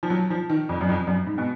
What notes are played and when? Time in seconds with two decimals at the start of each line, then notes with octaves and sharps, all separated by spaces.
0.03 F3
0.10 F#3
0.30 F3
0.50 D#3
0.69 F2
0.81 F#2
0.89 F2
1.07 F#2
1.27 G#2
1.38 B2